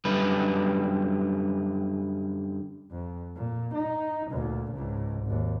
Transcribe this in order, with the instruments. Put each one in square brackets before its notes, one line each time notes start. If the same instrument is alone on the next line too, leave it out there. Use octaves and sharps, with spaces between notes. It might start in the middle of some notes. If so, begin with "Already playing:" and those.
[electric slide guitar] F#2 D3 G3 B4
[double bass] F2
A#2
D#4
D2 A#2
C#2 G#2
G#1 D#2